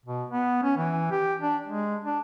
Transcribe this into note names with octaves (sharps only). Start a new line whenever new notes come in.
B2
B3
C#4
E3
G4
D4
G#3
D4